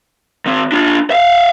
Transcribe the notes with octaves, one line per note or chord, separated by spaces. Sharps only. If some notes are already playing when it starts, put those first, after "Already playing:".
D#3 C4
D4 F4
E5 F5